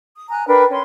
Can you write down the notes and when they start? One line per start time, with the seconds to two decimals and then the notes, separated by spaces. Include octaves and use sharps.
0.16 D#6
0.30 G#5 A#5 F#6
0.48 D4 A#4 B4 G5
0.70 C#4 C6